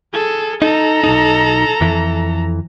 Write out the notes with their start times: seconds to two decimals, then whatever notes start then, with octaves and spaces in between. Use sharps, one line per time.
0.13 G#4 A4
0.62 D#4 A4 A#5
1.04 B1 F#2 D#4
1.81 F2 E3